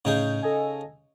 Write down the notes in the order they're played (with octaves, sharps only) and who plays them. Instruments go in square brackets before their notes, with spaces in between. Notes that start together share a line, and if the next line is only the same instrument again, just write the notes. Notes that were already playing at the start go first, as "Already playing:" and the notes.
[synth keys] A2 G6 [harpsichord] C#3 D#4 G#4
[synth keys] A4 D#5 G#5